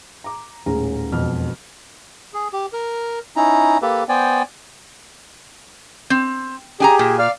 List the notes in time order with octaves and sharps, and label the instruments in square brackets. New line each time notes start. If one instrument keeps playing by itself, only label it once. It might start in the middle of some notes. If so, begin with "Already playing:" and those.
[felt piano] A#5 D6
D#1 A2 G#3 C#4 A#5
E1 F2 B2 F6
[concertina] G#4
G4
A#4
C#4 D#4 E4 A#5
A#3 G4 A4 B4
B3 C5 D5 G5 G#5
[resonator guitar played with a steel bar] C4
[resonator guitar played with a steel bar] D4 G#5 A#5 [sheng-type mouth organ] G4 G#4
[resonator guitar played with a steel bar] A#2
[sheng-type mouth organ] D5 F5 F6